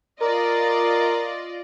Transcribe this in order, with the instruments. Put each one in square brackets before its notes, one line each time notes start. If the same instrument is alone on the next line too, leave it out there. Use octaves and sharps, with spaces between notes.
[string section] F4 D5 D#5 [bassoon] A#4